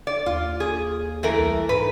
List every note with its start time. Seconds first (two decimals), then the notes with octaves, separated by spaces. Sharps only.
0.07 D5
0.26 D#2 F4
0.60 G#4
1.23 E3 A3 A#4
1.39 C2
1.69 G#2 B4